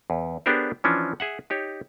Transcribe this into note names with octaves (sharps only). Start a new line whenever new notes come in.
E2
B3 D4 G4 G#4 A#4 C5
E3 F3 C#4 D4
G#4 E5 F#5
D#4 G4 C#5